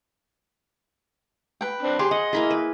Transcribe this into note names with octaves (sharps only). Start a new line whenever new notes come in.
B4 G5
C4 D4
G4 G#4 C6
D#5 F#5
A#3 E4 G#4
B4